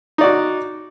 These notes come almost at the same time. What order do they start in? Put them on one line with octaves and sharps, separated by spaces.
D#4 D5 F#4